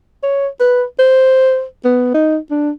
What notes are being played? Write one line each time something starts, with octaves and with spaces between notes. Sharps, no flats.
C#5
B4
C5
B3
D#4
D4